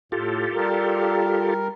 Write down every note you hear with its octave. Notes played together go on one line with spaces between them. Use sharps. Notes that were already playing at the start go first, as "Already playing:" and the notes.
A2 F4 G4 A4
G3 A#4